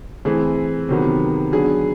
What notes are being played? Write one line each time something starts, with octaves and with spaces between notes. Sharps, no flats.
E3 A3 C4 G#4
C3 D#3 F#3 B3
D3 F#3 B3 G#4